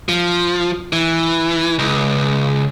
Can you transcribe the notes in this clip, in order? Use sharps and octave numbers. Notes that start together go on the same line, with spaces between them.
F3
E3
C#2